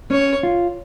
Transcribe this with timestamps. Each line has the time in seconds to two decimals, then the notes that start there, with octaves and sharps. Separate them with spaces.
0.11 C#4 C#5
0.43 F4